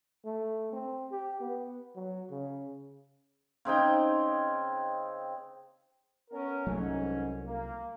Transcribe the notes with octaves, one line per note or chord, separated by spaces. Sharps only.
A3
C4
G4
B3
F#3
C#3
C#3 C4 D#4 G5
B3 C#4 A#4
C2 G#2 F#3 A3 C#4
A#3